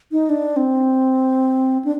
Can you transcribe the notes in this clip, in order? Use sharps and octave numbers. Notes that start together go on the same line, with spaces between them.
D#4
D4
C4
D4